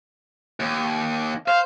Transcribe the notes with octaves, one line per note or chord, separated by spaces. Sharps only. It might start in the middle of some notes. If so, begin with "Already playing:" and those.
D#2
C5 F5